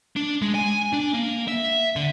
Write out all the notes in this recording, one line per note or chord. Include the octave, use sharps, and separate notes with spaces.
D4
G#3
G#5
D4
A#3
E5
D3